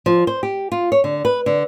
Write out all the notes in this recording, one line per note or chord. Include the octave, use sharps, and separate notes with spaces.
F3
C5
G4
F4
C#5
D3
B4
D3